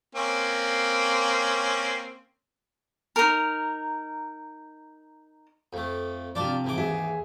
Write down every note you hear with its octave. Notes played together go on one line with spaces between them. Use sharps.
A#3 C4 C#4
D#4 A#4
F2 A3
C3 F3 D4 F4 D5
G#2 E3 D6
D#2 G#4 E5